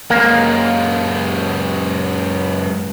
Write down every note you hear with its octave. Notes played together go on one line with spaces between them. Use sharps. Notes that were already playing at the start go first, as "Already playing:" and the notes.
F#2 G#3 A#3